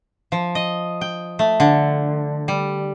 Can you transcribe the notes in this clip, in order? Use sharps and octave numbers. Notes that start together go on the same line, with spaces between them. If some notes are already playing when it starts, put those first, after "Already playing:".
F3
D#5
G5
A3
D3
G3